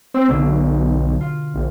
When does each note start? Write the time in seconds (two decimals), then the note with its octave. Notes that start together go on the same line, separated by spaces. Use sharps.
0.14 C4 E6
0.29 B1 B2 D3
1.21 F4
1.54 A#1